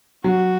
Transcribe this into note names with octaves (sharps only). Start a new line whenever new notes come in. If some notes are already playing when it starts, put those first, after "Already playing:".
F#3 F#4